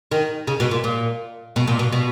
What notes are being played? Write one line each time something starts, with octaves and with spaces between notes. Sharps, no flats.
D#3
C#3
B2
A#2
A#2
B2
A#2
B2
B2